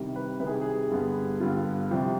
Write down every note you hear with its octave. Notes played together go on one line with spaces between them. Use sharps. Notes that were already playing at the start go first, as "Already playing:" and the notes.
Already playing: C2 C3 D#3 G3
B4
C2 C3 D#3 G3 B4
G#4
G4
G#4
G2 D3 G3 B3
G2 D3 G3 B3 F4
C2 C3 F3 G4